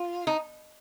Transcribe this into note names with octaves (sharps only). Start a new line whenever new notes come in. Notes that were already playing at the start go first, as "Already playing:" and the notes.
Already playing: F4
D#4